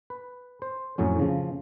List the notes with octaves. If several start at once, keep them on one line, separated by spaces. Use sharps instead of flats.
B4
C5
F2 A2 F#3 C#4
C#3 F3